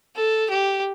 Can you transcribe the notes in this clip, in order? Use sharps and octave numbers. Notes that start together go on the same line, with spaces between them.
A4
G4